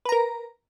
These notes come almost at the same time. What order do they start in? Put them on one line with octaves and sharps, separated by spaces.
B4 A#5 A#4